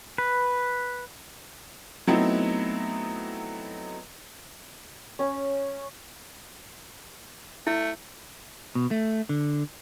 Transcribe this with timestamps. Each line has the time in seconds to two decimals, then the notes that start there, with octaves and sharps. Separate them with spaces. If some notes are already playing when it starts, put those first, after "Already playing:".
0.18 B4
2.07 F#3 A3 B3 C4 D#4 E4
5.19 C#4
7.67 A3 E4
8.75 B2
8.91 A3
9.29 D3